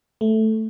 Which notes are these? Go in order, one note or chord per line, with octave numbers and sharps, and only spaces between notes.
A3